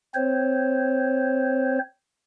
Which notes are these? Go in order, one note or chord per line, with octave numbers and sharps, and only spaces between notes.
C4 C5 C#5